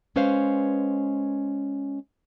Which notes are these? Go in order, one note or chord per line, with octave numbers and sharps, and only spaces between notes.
G#3 C#4 B4 C5 F5